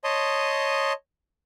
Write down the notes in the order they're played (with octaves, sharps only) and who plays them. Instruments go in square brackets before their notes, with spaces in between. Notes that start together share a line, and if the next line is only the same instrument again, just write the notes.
[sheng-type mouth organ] C#5 D#5 A5 C6 D#6